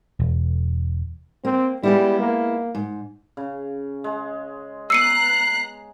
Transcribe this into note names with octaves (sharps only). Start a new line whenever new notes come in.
E1
A#3 C4
G3 G#3 B3 E4
A#3
G#2
C#3
G#3
B3 A#5 E6 F#6 C7 C#7 D#7